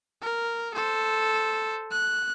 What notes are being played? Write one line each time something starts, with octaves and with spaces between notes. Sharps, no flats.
A#4
A4 C5
F#6